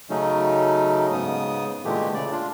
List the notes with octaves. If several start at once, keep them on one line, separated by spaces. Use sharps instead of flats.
C#3 F#3 A3 C#4 D#4
G#2 C#3 B3 D#6
A#2 D3 E3 G#3 A3 G4
C#3 D5
D4 F4